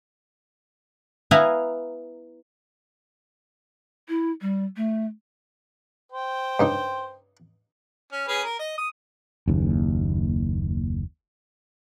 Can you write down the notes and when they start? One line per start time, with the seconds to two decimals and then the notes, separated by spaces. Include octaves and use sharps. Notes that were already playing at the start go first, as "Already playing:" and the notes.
1.31 B3 E4 B4 F5 G#5 A#5
4.09 E4
4.41 G3
4.76 A3
6.12 C5 G5
6.59 G2 C#3 D#4
8.12 C#4
8.28 C#4 G#4 B4
8.44 A#4
8.59 D#5
8.78 D#6
9.48 F#1 D#2